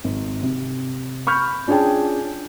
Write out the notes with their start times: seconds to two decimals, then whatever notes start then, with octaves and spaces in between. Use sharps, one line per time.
0.04 G#1
0.43 C3
1.27 B5 C#6 F6 G6
1.68 C#4 D4 F4 G#4 G5 A5